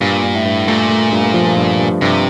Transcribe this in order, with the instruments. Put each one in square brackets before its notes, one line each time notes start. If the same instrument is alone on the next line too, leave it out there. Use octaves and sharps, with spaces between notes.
[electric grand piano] G2 [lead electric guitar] A#2
[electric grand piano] G2
[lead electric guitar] A2
[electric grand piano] G2
[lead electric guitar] A#2 [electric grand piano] A3
[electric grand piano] A3
G2
F3
G2
G2
[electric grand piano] G2 [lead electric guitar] C3